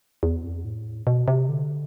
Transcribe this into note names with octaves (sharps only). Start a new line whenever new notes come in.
E2
F2
A2
B2
C3
D3